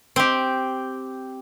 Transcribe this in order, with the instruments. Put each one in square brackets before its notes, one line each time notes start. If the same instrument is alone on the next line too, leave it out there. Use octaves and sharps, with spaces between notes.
[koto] C4 G4